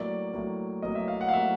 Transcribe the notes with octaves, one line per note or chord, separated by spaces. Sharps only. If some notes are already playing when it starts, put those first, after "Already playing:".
Already playing: A2 F#3 A#3 D5
A2 F#3 A#3
A2 F#3 A#3 D#5
E5
F5
F#5
F5
A2 F#3 A#3 E5